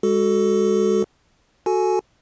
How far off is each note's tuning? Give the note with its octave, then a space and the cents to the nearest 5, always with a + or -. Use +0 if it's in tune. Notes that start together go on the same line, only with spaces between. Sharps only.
G#3 -25 F#4 +15 A4 +0
F#4 +0 A4 +0 G#5 +20